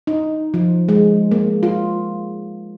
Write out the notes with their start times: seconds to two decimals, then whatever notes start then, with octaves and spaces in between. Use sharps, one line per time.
0.07 D#4
0.54 F3
0.89 G#3
1.31 A#3
1.63 F4